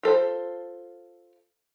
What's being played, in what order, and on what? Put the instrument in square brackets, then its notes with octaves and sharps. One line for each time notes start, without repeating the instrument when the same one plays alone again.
[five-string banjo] F4 A4 C5